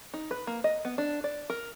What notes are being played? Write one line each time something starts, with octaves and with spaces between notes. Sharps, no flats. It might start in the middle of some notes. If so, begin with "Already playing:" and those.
D#4
B4
A#3
D#5
B3
D4
D5
A#4